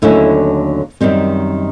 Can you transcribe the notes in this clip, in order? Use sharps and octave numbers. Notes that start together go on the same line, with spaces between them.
D#2 D3 F#3 A3 C#4 E4
F#2 D#3 G3 C4